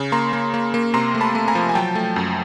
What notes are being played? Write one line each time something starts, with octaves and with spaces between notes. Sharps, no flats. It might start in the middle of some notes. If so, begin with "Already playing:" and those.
Already playing: C#3
A#3 A#5 C6
A#3
A#3
A#3
C3 A#5 C6
A3
A5 B5
A3
G#5 A#5
F3
G#5
F#3 G5 A5
A3
F#2